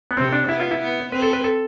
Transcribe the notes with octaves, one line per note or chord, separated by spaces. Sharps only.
B3
C3 C4
D4
B3 E4
F4
E4
B3
C4 B4
A4
B4
A4